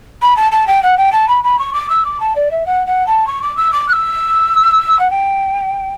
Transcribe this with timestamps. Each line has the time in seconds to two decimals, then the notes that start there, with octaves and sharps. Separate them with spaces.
0.22 B5
0.36 A5
0.51 A5
0.67 G5
0.82 F#5
0.97 G5
1.12 A5
1.28 B5
1.43 B5
1.58 C#6
1.73 D6
1.89 E6
2.04 D6
2.20 A5
2.35 D5
2.51 E5
2.66 F#5
2.86 F#5
3.06 A5
3.27 C#6
3.42 D6
3.57 E6
3.72 D6
3.88 F#6
3.92 E6
4.99 F#5
5.10 G5